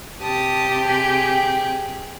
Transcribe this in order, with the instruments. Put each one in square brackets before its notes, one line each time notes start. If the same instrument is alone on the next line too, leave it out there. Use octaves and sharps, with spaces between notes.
[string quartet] C3 G4 [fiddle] A5 D#6
[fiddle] G#4 G5